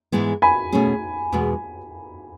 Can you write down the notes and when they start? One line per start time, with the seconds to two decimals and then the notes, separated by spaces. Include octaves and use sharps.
0.12 G#2 E3 G#3 B3 E4
0.42 G#5 B5
0.72 B2 A3 C#4 G#4
1.32 E2 B2 G#3 B3